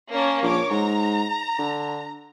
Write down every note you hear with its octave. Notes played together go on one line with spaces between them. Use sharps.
A#3 C#4 A5
A#1 C#5 D6
G#2 A#5
D3